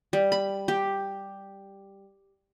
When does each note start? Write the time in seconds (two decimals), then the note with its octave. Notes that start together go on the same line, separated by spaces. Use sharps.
0.13 G3
0.32 B5
0.68 G4